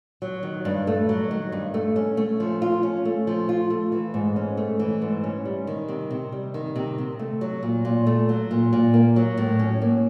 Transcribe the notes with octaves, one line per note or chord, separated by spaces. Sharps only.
F#3
D#3
G2
A3
F#3
D#3
G2
A3
C#4
A3
F3
F4
C#4
A3
F3
F4
A3
E3
G#2
C#4
A3
E3
G#2
C#4
G3
D#3
C3
C3
G3
D#3
C3
C3
A3
F#3
A#2
A#2
A3
F#3
A#2
A#2
A#3
F#3
A2
C#4
A#3